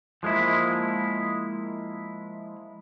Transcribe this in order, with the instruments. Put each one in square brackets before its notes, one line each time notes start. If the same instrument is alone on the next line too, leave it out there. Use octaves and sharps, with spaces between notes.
[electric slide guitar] F3 G#3 A#3 E4